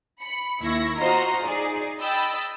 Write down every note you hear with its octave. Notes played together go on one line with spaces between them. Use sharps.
B5 C#7
D#2 E4 C#6 A#6
F4 F#4 C5 D#5 A#5
D#4 G#4 D5
D#5 G5 B5 E6 A6